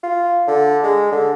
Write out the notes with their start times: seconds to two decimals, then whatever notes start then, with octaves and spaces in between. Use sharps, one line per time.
0.03 F4
0.48 D3
0.84 G#3
1.12 D3